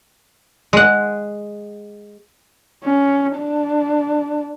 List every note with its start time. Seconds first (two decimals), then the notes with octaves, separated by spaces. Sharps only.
0.73 G#3 F#5
2.84 C#4
3.37 D4